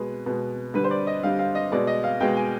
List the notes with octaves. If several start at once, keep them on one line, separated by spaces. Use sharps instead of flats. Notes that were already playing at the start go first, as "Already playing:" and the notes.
Already playing: B2 G#3 B4
B2 G#3
D3 G3 B4
C5
D5
D#5
D3 G3 F5
F5
D#5
B2 G#3 D5
D#5
F5
B2 G#3 G5
G#5